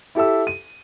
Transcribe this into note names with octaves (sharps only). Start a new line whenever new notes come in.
E4 G4 A4 E5 E6
D#7